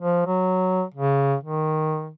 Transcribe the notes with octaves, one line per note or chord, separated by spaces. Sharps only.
F3
F#3
C#3
D#3